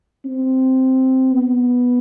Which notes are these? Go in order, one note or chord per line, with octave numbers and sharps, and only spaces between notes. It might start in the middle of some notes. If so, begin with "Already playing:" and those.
C4
B3